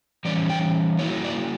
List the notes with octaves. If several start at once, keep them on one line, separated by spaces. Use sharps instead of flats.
E3 G3 C#4 D5
G5
F#3 A#3 C#4 E4 C#5
D5